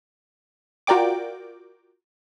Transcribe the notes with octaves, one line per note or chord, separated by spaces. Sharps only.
F4 F#4 A#4 D5 G5 D6